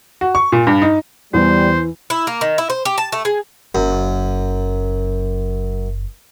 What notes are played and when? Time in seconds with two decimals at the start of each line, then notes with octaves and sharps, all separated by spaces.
0.21 F#4
0.35 C#6
0.52 A#2
0.67 G2
0.82 D#4
1.34 E2 E3 G3 C5
2.10 E4
2.27 A#3
2.41 D#3
2.58 E4
2.70 C5
2.85 G4
2.98 A5
3.12 A3
3.25 G#4
3.75 F#1 F#2